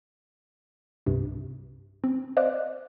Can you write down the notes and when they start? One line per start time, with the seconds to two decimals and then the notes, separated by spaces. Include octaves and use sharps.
1.06 C2 G2 C3
2.04 C4
2.37 C5 D5 D#5 F5 D6 F#6